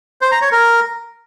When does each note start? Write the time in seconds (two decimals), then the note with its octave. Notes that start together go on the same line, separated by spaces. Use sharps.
0.21 C5
0.32 A#5
0.42 C#5
0.52 A#4